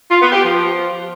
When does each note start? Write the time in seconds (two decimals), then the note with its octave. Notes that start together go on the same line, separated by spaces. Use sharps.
0.10 F4
0.21 B3
0.32 G4
0.44 F3